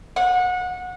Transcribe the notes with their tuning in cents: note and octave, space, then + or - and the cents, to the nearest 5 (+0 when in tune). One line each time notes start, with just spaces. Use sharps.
F#5 -25